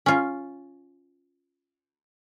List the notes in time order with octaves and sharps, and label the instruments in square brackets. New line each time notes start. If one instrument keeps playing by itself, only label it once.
[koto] C#4 F4